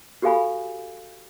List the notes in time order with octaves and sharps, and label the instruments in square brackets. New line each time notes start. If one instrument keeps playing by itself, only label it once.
[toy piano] F#4 G4 A4 F5 G#5 B5